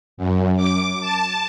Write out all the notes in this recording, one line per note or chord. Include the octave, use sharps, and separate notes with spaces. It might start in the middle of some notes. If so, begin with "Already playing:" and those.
F#2
D6
A5